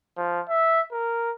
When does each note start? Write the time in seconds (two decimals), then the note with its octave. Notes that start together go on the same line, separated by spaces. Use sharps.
0.17 F3
0.49 E5
0.92 A#4